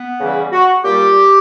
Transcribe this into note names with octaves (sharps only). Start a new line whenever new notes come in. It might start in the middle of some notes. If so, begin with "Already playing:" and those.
Already playing: B3
E2 C#3 E3 G3
F#4
A#2 G3 G4